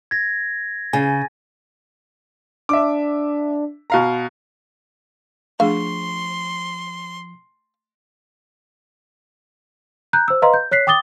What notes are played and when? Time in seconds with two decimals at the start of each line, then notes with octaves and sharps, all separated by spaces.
0.11 G#6 A#6
0.93 C#3 G#5 A6
2.69 D4 E5 D6
3.90 B2 F5 A#5
5.60 F3 A3 D4 G#4 F5 C6 C#6
10.13 A#5 F#6 G6
10.28 C5 E6
10.42 B4 D#5 F5 A#5 C6
10.54 G6
10.71 C#5 F#6 B6 C7
10.87 G5 D6 D#6 A6 G7